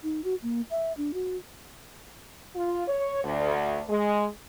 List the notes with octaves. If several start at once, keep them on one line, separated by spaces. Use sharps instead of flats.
D#4
F#4
A#3
E5
D4
F#4
F4
C#5
D2
G#3